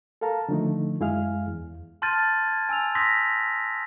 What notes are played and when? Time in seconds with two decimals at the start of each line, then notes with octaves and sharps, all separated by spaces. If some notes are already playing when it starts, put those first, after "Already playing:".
0.21 A4 A#4 F5 A5 A#5
0.49 D3 D#3 F3 A3 D#4
1.00 F#2 G#3 E4 G#4 F5 F6
1.48 E2
2.02 A5 C6 F6 G6 A6 D#7
2.47 G#6
2.69 G#5 E6 F7
2.95 C6 D#6 E6 G6 A#6 B6